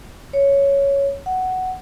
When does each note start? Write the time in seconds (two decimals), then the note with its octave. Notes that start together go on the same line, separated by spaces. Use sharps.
0.33 C#5
1.26 F#5